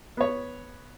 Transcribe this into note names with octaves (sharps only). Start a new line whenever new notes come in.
B3 C#5